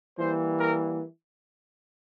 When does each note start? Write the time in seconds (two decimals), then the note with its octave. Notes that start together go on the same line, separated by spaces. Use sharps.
0.18 E3 G3 A#3 C5
0.60 A#4